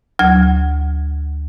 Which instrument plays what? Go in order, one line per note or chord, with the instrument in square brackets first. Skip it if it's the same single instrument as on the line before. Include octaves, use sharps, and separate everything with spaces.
[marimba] D2 F#3 G#6